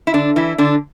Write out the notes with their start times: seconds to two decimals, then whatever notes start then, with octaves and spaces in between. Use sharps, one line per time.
0.07 E4
0.14 D3 D4
0.36 E3 E4
0.58 D3 D4